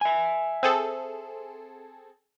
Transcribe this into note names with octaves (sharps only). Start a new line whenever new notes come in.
E5 G#5
C4 G#4 A4